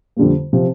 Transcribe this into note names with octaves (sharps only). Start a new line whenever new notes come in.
F2 D3 G3 A#3
C3 F3